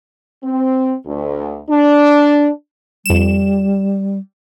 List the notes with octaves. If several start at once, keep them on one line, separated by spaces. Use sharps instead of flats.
C4
D2
D4
F2 G3 E7